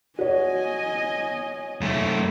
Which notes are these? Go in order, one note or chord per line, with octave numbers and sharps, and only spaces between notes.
F#4 C#5 D#5 G#5
F#2 A3